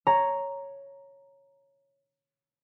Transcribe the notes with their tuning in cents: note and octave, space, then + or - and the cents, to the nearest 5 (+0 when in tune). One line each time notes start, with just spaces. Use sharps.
C#5 +0 A#5 +0